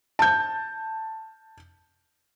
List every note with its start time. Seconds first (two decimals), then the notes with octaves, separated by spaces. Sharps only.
0.19 A5 G6